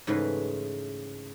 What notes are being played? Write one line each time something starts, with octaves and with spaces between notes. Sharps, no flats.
G#2 C#3 E3 G#3 A3 B4